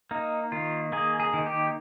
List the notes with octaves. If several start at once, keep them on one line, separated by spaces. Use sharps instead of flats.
A#3 D#4
D#3 F4
A#3 G#4
G#4
D#3
G4